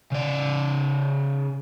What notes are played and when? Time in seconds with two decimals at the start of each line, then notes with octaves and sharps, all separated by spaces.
0.12 C#3 D5